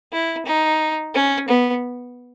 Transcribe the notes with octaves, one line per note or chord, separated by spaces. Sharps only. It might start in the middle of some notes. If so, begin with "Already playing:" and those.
E4
D#4
C#4
B3